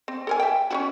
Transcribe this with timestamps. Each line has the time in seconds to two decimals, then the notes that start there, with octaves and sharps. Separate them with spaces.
0.08 C4
0.27 A4 A#4 G#5
0.40 E5 G5
0.70 C#4 E4 F#4